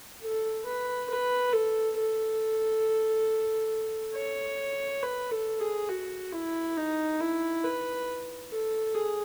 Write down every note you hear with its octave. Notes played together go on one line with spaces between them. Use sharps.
A4
B4
B4
A4
A4
C#5
B4
A4
G#4
F#4
E4
D#4
E4
B4
A4
G#4